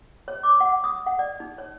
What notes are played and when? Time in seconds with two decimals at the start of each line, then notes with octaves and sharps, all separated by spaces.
0.28 C#5
0.43 D6
0.60 F#5
0.84 D#6
1.07 F#5
1.19 D5
1.40 D#4
1.58 C#5